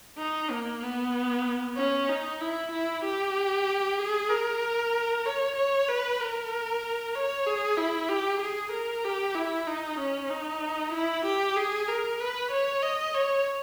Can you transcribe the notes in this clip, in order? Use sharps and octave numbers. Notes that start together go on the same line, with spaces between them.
D#4
A#3
B3
C#4
D#4
E4
E4
G4
G#4
A#4
C#5
C#5
B4
A#4
C#5
G#4
E4
G4
G#4
A#4
G4
E4
D#4
C#4
D#4
E4
G4
G#4
A#4
B4
C#5
D#5
C#5